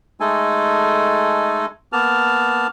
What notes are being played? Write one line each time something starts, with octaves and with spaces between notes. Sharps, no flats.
G#3 A3 D#4 A4 G#5
A#3 B3 A5 F6